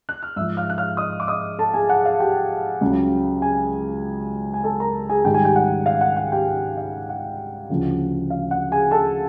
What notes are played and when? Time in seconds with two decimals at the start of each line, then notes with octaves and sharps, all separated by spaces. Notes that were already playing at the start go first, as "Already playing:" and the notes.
0.09 F#6
0.22 F6
0.36 G#2 F3 E5 E6
0.57 F5 F6
0.70 F#6
0.78 F5 F6
0.97 D#5 D#6
1.20 D6
1.28 D#5 D#6
1.59 A4 A5
1.74 G#4 G#5
1.89 F#5
2.05 F5
2.20 G4 G5
2.81 C#2 C#3 F#3
3.42 G#4 G#5
4.54 G#5
4.64 A4 A5
4.80 A#4 A#5
5.09 G#4 G#5
5.25 G#2 D#3 G3 G5
5.34 G#5
5.45 G4 G5
5.56 F#5
5.86 F5
6.01 F#5
6.16 F#5
6.32 G4 G5
6.77 F5
7.09 F#5
7.70 D2 C#3 F3
8.30 F5
8.51 F#5
8.71 G#4 G#5
8.91 A4 A5